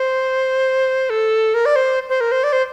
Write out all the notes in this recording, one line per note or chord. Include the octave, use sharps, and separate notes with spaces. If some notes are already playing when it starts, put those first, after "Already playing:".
Already playing: C5
A4
A#4
D5
C5
C5
A#4
C5
D5
C5